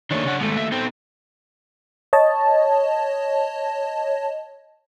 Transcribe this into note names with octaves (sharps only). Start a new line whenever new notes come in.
D#3 A3 A#3 D4 C#5
C#3 F#5
D#2 D#3 G#3 A3
E5
B3 C4 D#4 A4
C#5 D#5 A5